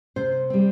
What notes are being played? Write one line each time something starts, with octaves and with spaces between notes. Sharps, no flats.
C3 C5
G3 C4